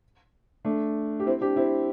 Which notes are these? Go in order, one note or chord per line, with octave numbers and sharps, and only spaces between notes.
A3 D4
G4
C4 E4
D4 G4
C4 E4